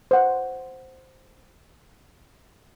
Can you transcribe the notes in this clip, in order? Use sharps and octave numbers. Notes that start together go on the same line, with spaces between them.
C5 F#5